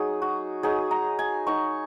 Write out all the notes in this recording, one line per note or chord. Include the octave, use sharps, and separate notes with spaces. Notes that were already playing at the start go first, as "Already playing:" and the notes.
Already playing: F#3 D#4 G#4
F#4
F#3 D#4 G#4
A#5
G#5
F#3 D#4 C#6